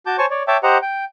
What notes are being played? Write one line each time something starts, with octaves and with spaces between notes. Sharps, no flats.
F#4 A5 D6 G6
C5 C#5 G#5 A5 C#6
C#5 D5
C#5 E5 G5 A5 D6
G4 C5 D#5 F#5 A#5
G5